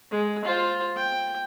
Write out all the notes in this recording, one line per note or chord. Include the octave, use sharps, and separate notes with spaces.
G#3
F4 C5
G5